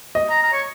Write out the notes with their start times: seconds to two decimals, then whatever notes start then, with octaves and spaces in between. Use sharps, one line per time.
0.15 D#5
0.29 A#5
0.43 A#5
0.53 C#5